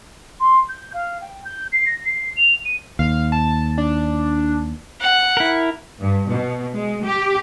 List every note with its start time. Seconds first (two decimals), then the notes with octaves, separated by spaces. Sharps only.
0.40 C6
0.68 G6
0.93 F5
1.21 G5
1.44 G6
1.72 C7
1.86 A#6
2.04 C7
2.36 F7
2.65 D#7
2.99 D#2 F5
3.32 A5
3.78 D4
5.01 F#5
5.37 E4 A#4
6.00 G2
6.29 B2
6.73 G#3
7.04 G4